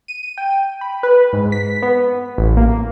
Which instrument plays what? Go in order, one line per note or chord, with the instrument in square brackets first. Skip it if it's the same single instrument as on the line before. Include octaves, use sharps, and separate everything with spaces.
[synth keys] D#7
G5
B5
B4
G#2
B6
B3
A1
A#3